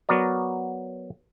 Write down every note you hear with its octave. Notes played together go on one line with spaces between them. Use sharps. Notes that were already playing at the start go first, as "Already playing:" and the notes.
F#3 B3 F#4 A#4 D5